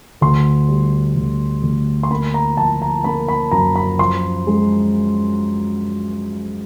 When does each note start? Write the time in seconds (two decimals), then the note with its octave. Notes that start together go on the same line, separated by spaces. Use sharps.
0.21 D2 C6
0.69 G3
1.16 D2
1.63 D2
2.03 C6
2.11 A#3 B5
2.34 A#5
2.57 F3 A5
2.82 A#5
3.04 A#3 B5
3.28 B5
3.51 F#2 A#5
3.76 B5
3.99 F3 C6
4.47 G#3